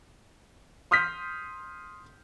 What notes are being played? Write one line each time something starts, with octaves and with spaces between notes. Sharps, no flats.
C6 D#6 F6 G6 B6